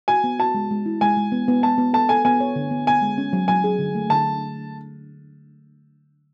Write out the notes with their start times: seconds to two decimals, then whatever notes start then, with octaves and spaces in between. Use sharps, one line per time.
0.08 F#4 G#5
0.24 B3
0.39 F#4 A5
0.54 G#3
0.71 G#3
0.86 E4
1.01 G#3 G#5
1.17 G#3
1.32 B3
1.48 B3
1.63 B3 A5
1.78 B3
1.93 A4 A5
2.09 A4 G#5
2.25 B3 G#5
2.40 C#5
2.56 D3
2.71 B3
2.87 B3 G#5
3.02 G#3
3.18 C#4
3.33 F#3
3.48 F#3 G#5
3.64 G#4
3.79 D3
3.95 A3
4.10 D3 A5